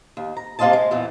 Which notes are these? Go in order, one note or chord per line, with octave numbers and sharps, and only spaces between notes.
D#2
A#5
C3 A#3 F4 C5 D#5 A5
G#3
E2 A#2 E3